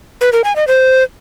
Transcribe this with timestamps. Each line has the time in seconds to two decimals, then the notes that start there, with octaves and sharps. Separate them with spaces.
0.21 B4
0.33 A#4
0.44 G#5
0.56 D#5
0.67 C5